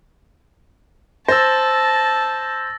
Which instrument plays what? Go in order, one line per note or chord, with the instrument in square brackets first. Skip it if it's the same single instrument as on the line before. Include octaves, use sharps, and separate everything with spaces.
[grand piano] C5 [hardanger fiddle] A5 [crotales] E6 A6 A#6